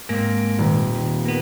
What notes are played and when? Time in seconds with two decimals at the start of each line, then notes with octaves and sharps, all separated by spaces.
0.09 G#2 A#3 C4 A#6
0.58 D#1
0.95 D#2
1.25 A#3 B3